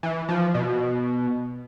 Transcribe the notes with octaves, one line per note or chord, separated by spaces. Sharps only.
E3
F3
B2